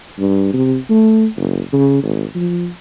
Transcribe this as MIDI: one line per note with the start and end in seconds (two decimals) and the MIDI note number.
0.19 0.50 43
0.54 0.76 48
0.90 1.26 57
1.36 1.60 30
1.73 1.98 49
2.03 2.24 32
2.35 2.68 53